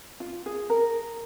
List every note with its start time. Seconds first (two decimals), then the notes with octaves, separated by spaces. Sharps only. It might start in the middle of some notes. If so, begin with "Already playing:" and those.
0.20 F4
0.46 G#4
0.70 A#4